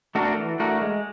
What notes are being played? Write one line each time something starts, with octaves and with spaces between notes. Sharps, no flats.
A3 D4 F#4 A#4
E3
A3 D4 F#4 A#4
G#3